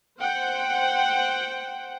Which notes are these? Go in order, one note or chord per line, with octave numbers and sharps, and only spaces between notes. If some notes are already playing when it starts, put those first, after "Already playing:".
C5 F#5 G5